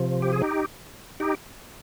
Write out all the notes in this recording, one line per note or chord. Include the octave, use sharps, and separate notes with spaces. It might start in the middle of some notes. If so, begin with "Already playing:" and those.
Already playing: C3 F3
G4
G#4
D#4 G4
D#4 G4